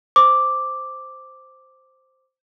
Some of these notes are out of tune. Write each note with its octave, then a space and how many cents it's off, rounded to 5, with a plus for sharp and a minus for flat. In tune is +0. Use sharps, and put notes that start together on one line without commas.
C5 +0 D6 +0